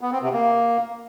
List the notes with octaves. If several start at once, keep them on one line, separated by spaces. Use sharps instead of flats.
B3
C4
C3
A#3